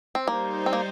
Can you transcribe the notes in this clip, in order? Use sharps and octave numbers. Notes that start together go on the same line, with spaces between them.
C4
G3 A#3 D#4 C5
C4
A#3